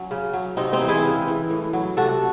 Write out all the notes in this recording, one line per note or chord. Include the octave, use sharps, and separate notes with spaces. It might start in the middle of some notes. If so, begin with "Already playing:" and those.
Already playing: F#3 C#4
C#3
F#3
C3 C4 D#4
C4 D#4
E3
E4 G#4
C#3
E3
A2
F#3
C3 F#4 A4